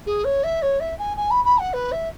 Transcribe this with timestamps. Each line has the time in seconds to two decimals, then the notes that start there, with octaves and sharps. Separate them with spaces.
0.06 G#4
0.24 C#5
0.43 E5
0.62 C#5
0.80 E5
0.98 G#5
1.17 G#5
1.30 B5
1.44 B5
1.58 F#5
1.73 B4
1.91 E5